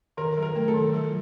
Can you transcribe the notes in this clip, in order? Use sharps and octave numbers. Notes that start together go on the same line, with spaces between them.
D#3 A#4
F#3
A#4
A3
A4
D#3
F#3